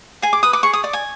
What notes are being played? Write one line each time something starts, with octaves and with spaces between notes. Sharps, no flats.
G#4 G#5
D6
B4 D#6
D6
G#4 C#6
D#6
D5 D6
G#5